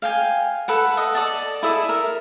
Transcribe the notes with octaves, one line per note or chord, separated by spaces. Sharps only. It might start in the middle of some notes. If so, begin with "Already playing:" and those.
F5 G5 G#5
A4 B4 F#5
D#5 E5
A4 D5 D#5 A5
E4 G#4 A4 E5
A#4